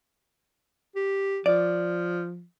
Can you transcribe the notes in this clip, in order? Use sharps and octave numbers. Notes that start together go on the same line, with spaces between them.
G4
F3 D5